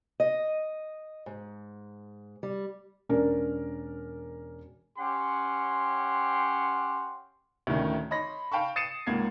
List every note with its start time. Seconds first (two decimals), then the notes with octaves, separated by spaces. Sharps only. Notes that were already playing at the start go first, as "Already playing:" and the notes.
0.20 D#5
1.26 G#2
2.43 G3
3.09 E1 C#4 D4 A#4
4.98 C#4 G4 F#5 C6
7.67 D2 A2 D#3 C#4
8.11 C#5 D#5 B5 C6 A#6
8.52 F5 G5 A5 B5 C#6
8.76 D#6 A6 C7 C#7 D#7 E7
9.06 C#2 G#2 A#3 G#6 C7